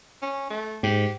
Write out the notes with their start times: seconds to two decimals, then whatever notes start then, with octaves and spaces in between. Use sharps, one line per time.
0.22 C#4
0.50 A3
0.83 G#2 G4